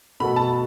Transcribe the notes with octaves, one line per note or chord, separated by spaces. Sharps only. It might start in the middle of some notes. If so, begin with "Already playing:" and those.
B2 A3 F#4 A4 B5
A5